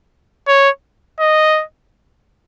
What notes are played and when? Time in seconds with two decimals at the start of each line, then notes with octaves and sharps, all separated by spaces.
0.48 C#5
1.20 D#5